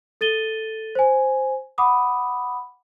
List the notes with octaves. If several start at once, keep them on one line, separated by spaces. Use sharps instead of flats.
A4 A6 D#7 G7
C5 G#5
F#5 B5 D6 D#6